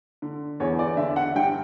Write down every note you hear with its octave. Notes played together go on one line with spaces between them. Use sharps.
D3
E2 C#5
D5
D3 E5
F#5
G2 G5